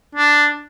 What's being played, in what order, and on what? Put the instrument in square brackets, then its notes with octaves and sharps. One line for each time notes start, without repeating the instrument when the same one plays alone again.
[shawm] D4